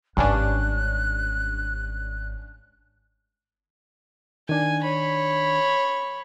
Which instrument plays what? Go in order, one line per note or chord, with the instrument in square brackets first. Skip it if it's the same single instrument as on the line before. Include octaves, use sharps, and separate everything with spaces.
[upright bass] G#1 [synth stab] G2 C#4 D4 [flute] F#6
[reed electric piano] D#3 D4 [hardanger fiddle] G#5
[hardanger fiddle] C#5 B5